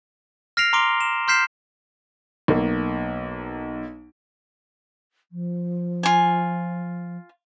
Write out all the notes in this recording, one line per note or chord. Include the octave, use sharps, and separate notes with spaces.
F6 A#6 C7 D7 F7
A#5 C6 D6 D7 G7
E7
C6 F6 G6 B6 C7 E7
B1 A#3
F3
F4 G#5